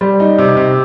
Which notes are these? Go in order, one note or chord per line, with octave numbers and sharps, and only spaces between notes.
G3
D#4
C3
C3